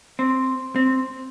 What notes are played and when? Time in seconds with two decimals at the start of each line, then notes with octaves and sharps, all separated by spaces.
0.19 C4
0.76 C4